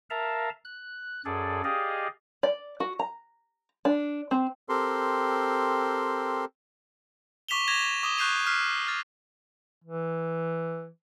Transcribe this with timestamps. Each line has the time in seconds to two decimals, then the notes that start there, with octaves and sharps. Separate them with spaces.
0.10 A#4 E5 F5 A5 A#5
0.65 F#6
1.25 F#2 G#4 A4 D5
1.64 G4 G#4 D5 D#5 F5
2.43 D5
2.80 F#4
2.99 A#5
3.85 D4
4.31 C4
4.69 C4 G4 A4 A#4 C6
7.49 C#6 D6 B6 E7 F7 G7
7.68 D6 G#6 A#6 E7 F7
8.03 D6 D#6 B6 G7
8.18 C#6 F#6 G6 C7 D#7 F7
8.47 F6 F#6 B6 C7
8.87 F6 A6
9.84 E3